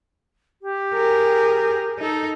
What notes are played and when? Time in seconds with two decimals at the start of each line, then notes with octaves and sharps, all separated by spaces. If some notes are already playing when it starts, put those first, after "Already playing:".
0.62 G4
0.94 G#4 A#4
1.99 D#4 A4